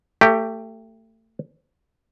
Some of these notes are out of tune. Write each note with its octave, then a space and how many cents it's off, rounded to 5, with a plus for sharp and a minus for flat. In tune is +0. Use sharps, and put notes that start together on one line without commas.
A3 +25 G4 +0